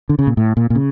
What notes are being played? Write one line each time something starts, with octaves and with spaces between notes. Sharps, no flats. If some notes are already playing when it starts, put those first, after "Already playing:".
D3
C#3
A#2
A2
A#2
A#2
C#3